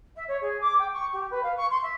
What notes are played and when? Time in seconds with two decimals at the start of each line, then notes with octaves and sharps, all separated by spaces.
0.16 E5
0.28 C#5
0.41 G#4
0.61 D6
0.79 G5
0.92 C#6
1.12 G4
1.30 B4
1.43 F5
1.56 C#6
1.70 C6
1.82 E5